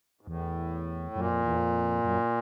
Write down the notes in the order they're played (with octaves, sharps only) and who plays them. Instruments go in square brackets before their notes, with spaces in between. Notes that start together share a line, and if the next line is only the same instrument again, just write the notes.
[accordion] G#2
[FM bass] E2 [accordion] A2
[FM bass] F#2 [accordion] A#2
[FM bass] F2
E2
F2
F#2